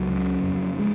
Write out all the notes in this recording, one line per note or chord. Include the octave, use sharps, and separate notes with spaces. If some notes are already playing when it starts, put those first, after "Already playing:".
Already playing: C#2 F#3
C#3
F2
G#3